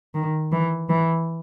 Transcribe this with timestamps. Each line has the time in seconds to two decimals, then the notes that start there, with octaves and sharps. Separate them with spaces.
0.14 D#3
0.52 E3
0.89 E3